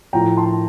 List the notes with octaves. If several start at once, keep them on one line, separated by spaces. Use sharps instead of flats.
A2 F3 G5 A#5
A5 C6